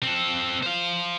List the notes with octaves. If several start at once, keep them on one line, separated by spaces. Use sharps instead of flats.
C4 A4
C5 F5